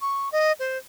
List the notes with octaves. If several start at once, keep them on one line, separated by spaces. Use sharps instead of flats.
C#6
D#5
C5